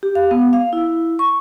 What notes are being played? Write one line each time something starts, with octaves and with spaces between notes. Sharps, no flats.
G4
F5
B3
F5
E4
C#6